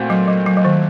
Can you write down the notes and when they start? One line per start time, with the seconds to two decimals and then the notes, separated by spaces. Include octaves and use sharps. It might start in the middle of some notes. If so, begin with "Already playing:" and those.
Already playing: A#2 A3 C4 F#4
0.10 F#3
0.28 F#3
0.46 F#3
0.57 F#3
0.65 D#3